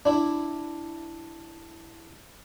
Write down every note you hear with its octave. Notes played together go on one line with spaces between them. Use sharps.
D4 E4